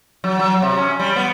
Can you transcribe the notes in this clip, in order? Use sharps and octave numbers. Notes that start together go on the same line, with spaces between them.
F#3
F#3
C3
C#4
G3
B3